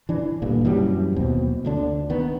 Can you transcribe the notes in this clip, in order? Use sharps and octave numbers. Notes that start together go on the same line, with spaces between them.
E3 D4
D2 G2 A#2
F#2 E3 F#3 G3
D#2 B2 C4
D2 D3 D4
D#3 B3